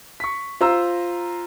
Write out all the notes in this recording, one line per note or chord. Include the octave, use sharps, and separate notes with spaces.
C#6 B6
F4 C5 A#5 E6